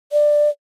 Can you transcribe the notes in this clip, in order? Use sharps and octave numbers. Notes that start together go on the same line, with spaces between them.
D5